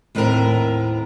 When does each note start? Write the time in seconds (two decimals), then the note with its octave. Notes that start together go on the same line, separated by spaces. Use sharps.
0.15 D#2 A2 B3 C4 A#4